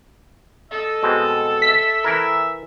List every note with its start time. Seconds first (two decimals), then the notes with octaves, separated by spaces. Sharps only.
0.71 A4 D#5
1.03 B2 G#3 C4
1.62 E5 B6
2.04 E3 E4 A#4